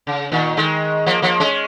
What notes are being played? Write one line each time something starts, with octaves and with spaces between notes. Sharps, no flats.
C#3
A#2 D#3
D#3 G#3
F3 A#3
F3 A#3
G#3 C#4